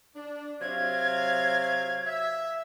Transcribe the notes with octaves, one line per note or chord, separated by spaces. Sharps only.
D4
C3 F#3 F5 G#6
E5